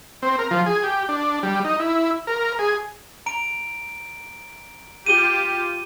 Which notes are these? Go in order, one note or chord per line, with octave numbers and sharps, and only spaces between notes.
C4
A#4
F3
G#4
G4
D4
G3
D#4
E4
A#4
G#4
A#5 D7
F4 G4 D#7 G7